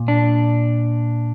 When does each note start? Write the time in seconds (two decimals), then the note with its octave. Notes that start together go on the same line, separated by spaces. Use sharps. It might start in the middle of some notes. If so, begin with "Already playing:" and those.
Already playing: A#2
0.08 D4